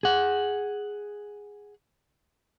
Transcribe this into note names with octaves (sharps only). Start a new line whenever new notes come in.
G#4 F#5